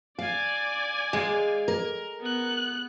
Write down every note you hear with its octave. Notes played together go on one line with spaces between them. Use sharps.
D5 F5 G#5
G#3 F5
A#4
B3 F#6